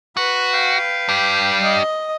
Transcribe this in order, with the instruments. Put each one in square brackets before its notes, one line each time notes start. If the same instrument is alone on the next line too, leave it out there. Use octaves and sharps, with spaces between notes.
[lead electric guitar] F#4 [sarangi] B4
[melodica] F5 G5
[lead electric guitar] D4 G4
[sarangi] D#5